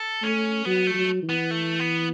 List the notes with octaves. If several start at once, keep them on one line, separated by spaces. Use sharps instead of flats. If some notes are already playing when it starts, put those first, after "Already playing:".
Already playing: A4
A3 C#4
F#3 B3
A3
F#3
E3
B3
A3
B3